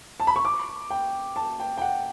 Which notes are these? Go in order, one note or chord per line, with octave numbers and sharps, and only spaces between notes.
A5
B5
C#6
D6
G5
A5
G5
G5
F#5